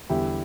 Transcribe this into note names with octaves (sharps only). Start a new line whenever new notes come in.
E2 D3 G3 E4 G4